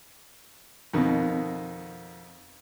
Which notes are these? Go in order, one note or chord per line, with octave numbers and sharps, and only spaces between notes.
F2 B2 D#3